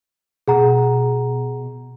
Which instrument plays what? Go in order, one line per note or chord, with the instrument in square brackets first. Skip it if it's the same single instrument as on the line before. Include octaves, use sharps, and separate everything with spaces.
[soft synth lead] B2 [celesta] G#4 F#5 A#5